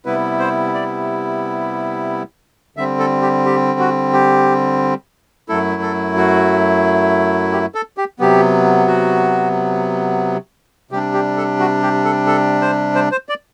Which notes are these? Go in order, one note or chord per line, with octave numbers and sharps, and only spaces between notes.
C3 G3 B3 E4 B4
C5
D5
D3 G3 C4 E5
A4
G4
G4
F#4
G4
F#2 F#3 A3 E4 A4
A4
F#4
G4
A4
G4
C3 F#3 B3 G4
F#4
C3 G3 D4 G4
G4
A4
F#4
G4
A4
A4
C5
C5
C5
D5